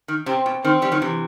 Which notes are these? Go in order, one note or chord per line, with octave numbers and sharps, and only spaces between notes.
D#3
C3 C4
B2
D#3 C4
E3 G3
D#3 F#3
C3 E3